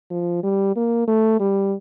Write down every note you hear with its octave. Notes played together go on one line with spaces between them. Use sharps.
F3
G3
A#3
A3
G3